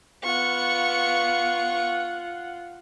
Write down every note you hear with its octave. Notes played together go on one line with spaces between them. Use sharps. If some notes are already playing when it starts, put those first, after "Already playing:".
B3 F4 F#5 C#6